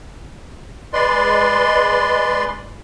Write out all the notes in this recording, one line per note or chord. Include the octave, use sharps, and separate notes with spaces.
G#3 B4 D5 C6